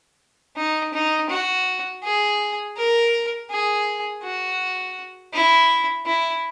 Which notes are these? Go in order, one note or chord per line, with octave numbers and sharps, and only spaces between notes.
D#4
D#4
F#4
G#4
A#4
G#4
F#4
E4
E4